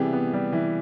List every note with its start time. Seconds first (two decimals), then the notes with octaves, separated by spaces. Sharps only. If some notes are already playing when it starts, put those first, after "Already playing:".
Already playing: C3 E3 G3 B3 G4 G#4
0.13 B3
0.34 G3
0.53 E3